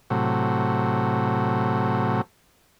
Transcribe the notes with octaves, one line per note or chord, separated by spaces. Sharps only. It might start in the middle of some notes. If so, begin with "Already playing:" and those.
A2 C3 F#3